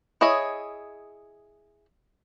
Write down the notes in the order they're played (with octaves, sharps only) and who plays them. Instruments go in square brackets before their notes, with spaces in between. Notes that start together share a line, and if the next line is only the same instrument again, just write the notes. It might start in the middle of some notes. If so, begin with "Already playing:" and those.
[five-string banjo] E4 G#4 C#5 D#5